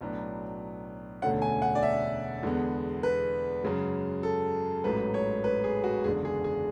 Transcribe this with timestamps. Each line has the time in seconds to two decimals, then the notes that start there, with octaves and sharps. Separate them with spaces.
0.01 B1 A2 F#3 B3 D4
1.22 E1 D2 D3 A3 C#4 F#5
1.42 G#5
1.62 F#5
1.75 D5
1.83 E5
2.43 E2 D3 G#3 B3
3.03 B4
3.64 F#2 C#3 G#3
4.23 A4
4.84 A1 G#2 F#3 A3 B4
5.14 C#5
5.44 B4
5.64 G#4
5.84 F#4
6.04 F#1 E2 D3 G#3 D4 G#4
6.25 G#4
6.44 G#4